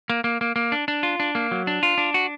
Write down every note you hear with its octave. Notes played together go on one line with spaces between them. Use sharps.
A#3
A#3
A#3
A#3
D4
D4
F4
D4
A#3
F#3
D4
F4
D4
F#4